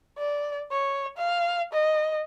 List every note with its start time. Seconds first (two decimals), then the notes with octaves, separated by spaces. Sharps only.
0.18 D5
0.71 C#5
1.17 F5
1.73 D#5